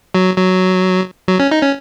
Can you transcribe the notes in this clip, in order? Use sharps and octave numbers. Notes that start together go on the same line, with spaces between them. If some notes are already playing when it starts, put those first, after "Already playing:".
F#3
F#3
F#3
C#4
D#4
C#4